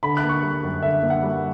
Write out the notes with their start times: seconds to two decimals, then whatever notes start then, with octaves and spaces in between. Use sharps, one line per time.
0.03 D3 B5
0.17 F#6
0.24 A#3
0.29 C#6
0.43 G3
0.64 F#2
0.82 D3 E5
1.03 A#3
1.10 F#5
1.23 G3